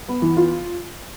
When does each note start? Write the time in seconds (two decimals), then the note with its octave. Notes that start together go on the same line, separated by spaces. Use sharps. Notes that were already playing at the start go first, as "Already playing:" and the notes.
0.09 B3
0.22 E3
0.37 F4